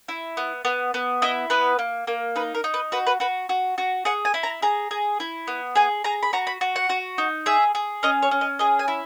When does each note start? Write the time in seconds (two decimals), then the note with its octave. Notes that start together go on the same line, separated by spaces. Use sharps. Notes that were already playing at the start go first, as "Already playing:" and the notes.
0.08 E4
0.37 B3
0.65 B3
0.94 B3
1.22 E4 D#5
1.50 B3 B4
1.79 A#3
2.07 A#3
2.36 D#4 B4
2.55 A#4
2.64 D#4
2.74 B4
2.92 F#4 B4
3.07 B4
3.20 F#4 B4
3.49 F#4
3.78 F#4
4.05 G#4 F#5
4.25 G#5
4.34 E4
4.43 A#5
4.62 G#4 A#5
4.91 G#4
5.20 E4
5.48 B3
5.76 G#4 G#5
6.04 G#4 A#5
6.23 B5
6.33 F#4 A#5
6.47 B5
6.61 F#4
6.76 F#5
6.89 F#4
7.18 D#4
7.46 G#4 E5
7.75 G#4
8.03 C#4 D#5
8.22 C#5
8.31 C#4
8.41 D#5
8.59 G#4 D#5
8.79 G#5
8.88 E4